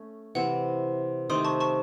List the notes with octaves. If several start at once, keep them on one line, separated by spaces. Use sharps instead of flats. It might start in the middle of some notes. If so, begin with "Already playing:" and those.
Already playing: A3 C#4
C3 E3 C4 F#5
C3 D#3 A3 C6 D#6
A5 C#6
A5 C#6